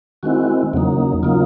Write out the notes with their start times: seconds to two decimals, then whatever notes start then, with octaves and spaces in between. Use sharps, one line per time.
0.23 D#3 G#3 C4 E4 F#4
0.73 E2 C#3 F#3 A#3 D#4
1.23 C#3 F#3 A#3 D#4 F4